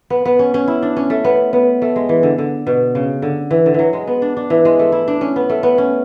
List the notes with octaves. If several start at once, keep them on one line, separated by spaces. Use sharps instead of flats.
B3
B3
C#4
C#4
E4
D4
C#4
A3
B3
B3
A3
G#3
E3
D3
D3
B2
C#3
D3
E3
D3
E3 F#3
G#3
B3
D4
D4
E3
G#3
A3
E4
D4
C#4
B3
A3
B3
C#4